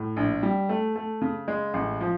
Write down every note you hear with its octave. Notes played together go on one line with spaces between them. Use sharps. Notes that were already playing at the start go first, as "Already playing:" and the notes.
Already playing: A2
A#1
G3
A3
A3
C#3
G#3
A1
F3